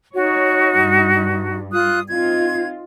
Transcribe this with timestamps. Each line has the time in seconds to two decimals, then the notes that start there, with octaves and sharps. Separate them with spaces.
0.14 D#4 F#4 C#5
0.82 G2
1.73 F4 D#6 F#6
2.09 C4 D#4 F4 G#6